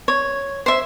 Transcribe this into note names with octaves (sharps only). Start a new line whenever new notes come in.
C#5
C5 E5